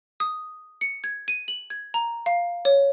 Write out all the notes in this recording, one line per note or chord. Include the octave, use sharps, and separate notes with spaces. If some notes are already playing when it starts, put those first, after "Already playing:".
D#6
C#7
G#6
D#7
F#7
G#6
A#5
F5
C#5